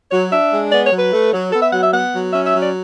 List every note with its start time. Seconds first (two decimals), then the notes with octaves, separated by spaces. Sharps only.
0.11 F#3 C#5
0.31 D4 E5
0.52 G#3
0.72 B3 D5
0.85 C#5
0.92 F#3
0.99 B4
1.12 A3
1.32 F#3
1.52 B3 A4
1.62 E5
1.72 F#3 F#5
1.82 E5
1.93 B3 F#5
2.13 F#3
2.33 C#4 E5
2.46 E5
2.53 F#3
2.60 D5